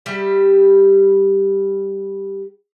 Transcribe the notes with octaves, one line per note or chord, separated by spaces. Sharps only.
G3 G4 E5